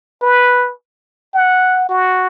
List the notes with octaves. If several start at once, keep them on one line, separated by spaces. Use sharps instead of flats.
B4
F#5
F#4